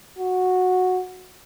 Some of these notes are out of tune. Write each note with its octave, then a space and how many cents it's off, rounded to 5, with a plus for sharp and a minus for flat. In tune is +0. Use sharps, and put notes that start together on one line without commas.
F#4 -10